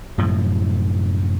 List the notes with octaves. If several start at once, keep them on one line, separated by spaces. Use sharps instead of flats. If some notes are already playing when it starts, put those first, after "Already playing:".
F#2 A2 C3 F3